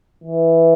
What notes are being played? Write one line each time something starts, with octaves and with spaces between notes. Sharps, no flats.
E3